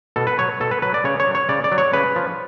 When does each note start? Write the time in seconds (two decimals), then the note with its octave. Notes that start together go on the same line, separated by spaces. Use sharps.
0.16 B2 A4
0.27 B4
0.38 F#3 C#5
0.60 B2 A4
0.71 B4
0.82 F#3 B4
0.94 D5
1.04 C#3 C#5
1.20 C#5
1.27 F#3
1.35 C#5
1.49 C#3 D5
1.64 D5
1.72 F#3
1.78 C#5
1.93 C#3 B4
2.16 F3